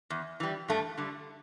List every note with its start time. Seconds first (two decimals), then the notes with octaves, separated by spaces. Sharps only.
0.10 E2
0.40 E3 G3
0.68 G2 A3
0.97 D3 G3